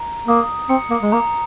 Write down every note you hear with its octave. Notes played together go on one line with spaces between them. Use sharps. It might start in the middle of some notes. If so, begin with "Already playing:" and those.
Already playing: A#5
A#3 D#6
C4 C#7
A#3
G#3
A#3 A#5